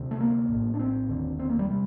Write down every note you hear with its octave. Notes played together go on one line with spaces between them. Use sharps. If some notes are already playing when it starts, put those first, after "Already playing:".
Already playing: D2 C3
A3
A#3
A#1 A2
D4
C4
F1 D#2 D3
C4
A#3
G3
C3 G3